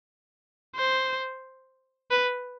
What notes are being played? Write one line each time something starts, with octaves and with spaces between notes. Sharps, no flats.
C5
B4